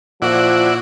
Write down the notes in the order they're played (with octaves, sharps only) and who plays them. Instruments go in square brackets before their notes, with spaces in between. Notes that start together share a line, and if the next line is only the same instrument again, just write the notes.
[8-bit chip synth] A#2 F#4 [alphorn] F3 [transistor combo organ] E4 D5 F#5